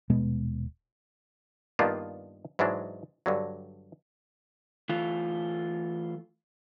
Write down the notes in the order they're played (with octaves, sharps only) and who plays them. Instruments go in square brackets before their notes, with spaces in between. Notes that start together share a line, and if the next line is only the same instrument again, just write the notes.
[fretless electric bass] D#1 B2 G#3 B3
[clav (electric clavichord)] G2 D#3 A#3 B3 D4 F4
G#2 E3 F#3 G#3 D4
G2 D3 F#3
[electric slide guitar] E3 A3 F4